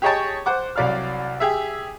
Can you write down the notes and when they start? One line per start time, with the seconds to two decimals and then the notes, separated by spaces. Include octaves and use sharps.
0.02 G4 G#4 C#5 D#5 G5 A5
0.46 C5 F#5 D6
0.76 C2 F#3 D5 F5 F6
1.40 G4 G#4 E5